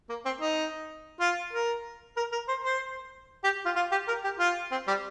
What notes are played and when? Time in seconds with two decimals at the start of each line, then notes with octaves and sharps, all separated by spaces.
0.09 A#3
0.25 C4
0.41 D#4
1.20 F4
1.53 A#4
2.17 A#4
2.32 A#4
2.48 C5
2.64 C5
3.44 G4
3.65 F4
3.76 F4
3.91 G4
4.08 A#4
4.24 G4
4.39 F4
4.72 C4
4.87 G3